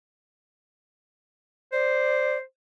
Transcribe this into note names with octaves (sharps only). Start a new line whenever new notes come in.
C5 D5